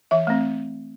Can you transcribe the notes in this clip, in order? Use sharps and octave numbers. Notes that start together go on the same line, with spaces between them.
E3 E5
A3 C4